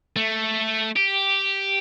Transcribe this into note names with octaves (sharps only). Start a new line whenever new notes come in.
A3
G4